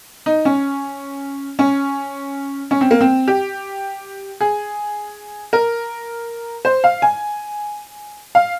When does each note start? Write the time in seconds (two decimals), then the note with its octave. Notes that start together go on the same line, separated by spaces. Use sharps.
0.26 D#4
0.45 C#4
1.59 C#4
2.71 C#4
2.81 C4
2.91 A#3
3.01 C4
3.28 G4
4.41 G#4
5.53 A#4
6.65 C5
6.84 F5
7.02 G#5
8.35 F5